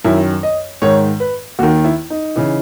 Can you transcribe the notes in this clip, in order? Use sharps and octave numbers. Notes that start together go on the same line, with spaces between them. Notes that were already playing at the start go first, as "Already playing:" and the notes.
F#2 D#3 E4
D#5
G#2 D#3 C#5
B4
D#2 D#3 F#4
E4
D#4
C#3 E3